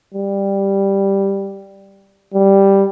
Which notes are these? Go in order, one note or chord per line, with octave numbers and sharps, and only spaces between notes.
G3
G3